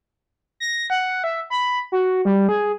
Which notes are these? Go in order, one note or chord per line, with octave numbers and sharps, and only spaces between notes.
A#6
F#5
E5
B5
F#4
G3
G#4